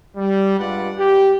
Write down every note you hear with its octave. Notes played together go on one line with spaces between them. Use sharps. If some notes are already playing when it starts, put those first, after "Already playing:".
G3
G2 G#3 F4 B4 D5 F#5
G4